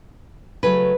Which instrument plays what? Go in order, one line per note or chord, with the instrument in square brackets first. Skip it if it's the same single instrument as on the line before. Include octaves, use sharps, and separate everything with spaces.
[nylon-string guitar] C#3 F#3 A3 B4